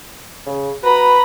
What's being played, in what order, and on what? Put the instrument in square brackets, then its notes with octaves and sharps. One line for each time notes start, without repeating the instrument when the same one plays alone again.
[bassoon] C#3
[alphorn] F#4 [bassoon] B4 [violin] A#5 B5